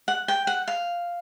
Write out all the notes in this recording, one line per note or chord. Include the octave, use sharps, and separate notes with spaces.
F#5
G5
F#5
F5